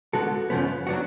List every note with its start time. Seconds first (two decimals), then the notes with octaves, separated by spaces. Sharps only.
0.13 D3 G#3 B3 F#4 A4
0.50 F#2 C#3 F3 B3
0.87 F#3 B3 D4 F#4